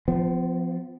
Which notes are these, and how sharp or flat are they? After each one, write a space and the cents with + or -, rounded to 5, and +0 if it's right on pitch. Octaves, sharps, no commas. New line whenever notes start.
F3 +0 B3 +45